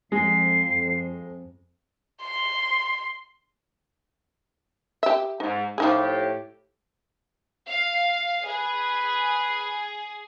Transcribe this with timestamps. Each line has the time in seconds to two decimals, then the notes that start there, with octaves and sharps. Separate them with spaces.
0.12 F2 G#3 C7
2.21 C6
5.03 G4 E5
5.40 G#2 D#4
5.78 A2 F3 D#4 G4 G#4
7.68 F5
8.47 G#4 B4